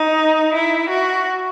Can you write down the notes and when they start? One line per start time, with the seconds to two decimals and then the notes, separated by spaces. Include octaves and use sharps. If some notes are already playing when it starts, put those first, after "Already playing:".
Already playing: D#4
0.53 E4
0.89 F#4